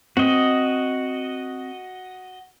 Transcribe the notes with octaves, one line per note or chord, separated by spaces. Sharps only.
C4 F#4 D#5